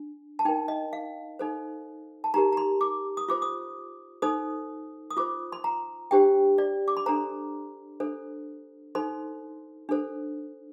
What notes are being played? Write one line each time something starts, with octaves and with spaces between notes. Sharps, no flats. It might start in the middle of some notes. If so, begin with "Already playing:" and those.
Already playing: D4
A5
D#4 A#4 G5
D#5
F5
D#4 A4 C5
A5
D#4 G4 A#4 A#5
A#5
C6
D6
D#6
F4 C5 D6
D#6
D#4 A4 C5 D#6
D#6
F4 C5 D6
C6
A#5
D4 G4 C5 G5
D5
D6
C6
D4 A4 C5 A#5
D4 A4 C5
D#4 A4 C5 C6
D4 A4 C5